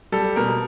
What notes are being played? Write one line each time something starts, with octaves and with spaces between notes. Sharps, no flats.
G3 A4
B2 A#4